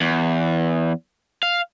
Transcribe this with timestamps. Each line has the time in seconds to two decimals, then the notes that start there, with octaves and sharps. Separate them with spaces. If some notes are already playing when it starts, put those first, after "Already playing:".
0.01 E2
1.43 F5